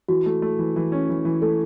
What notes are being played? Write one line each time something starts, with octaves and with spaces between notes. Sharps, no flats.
E3 F#4
A3
A3
E3
E3
C#4
E3
E3
A3 A4